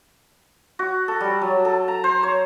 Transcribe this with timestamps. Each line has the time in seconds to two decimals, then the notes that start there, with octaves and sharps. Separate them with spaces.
0.79 F#4
1.08 A4
1.21 G3
1.42 F#3
1.65 A4
1.88 A#5
2.04 C5
2.23 C#5